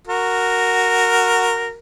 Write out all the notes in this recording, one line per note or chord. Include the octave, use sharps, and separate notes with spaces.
F#4 A#4